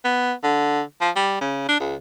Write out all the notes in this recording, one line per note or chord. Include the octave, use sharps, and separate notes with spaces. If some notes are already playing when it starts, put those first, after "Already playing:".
B3
D3
F3
G3
C#3
D4
C#2